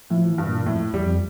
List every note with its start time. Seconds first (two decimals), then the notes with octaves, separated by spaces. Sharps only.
0.10 A2 F3
0.28 E3
0.38 G2
0.47 A#2
0.66 F2 A2
0.93 E2 G3
1.03 F2